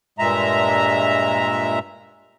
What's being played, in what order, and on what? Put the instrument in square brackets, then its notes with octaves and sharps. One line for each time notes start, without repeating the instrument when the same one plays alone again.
[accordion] G2 A#2 G#3 E5 A#5